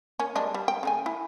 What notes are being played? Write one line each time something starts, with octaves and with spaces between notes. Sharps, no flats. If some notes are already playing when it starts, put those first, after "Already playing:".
A#3 C#4
G3 G#3 D4
G3
G5
C#3 A3 G#5
E4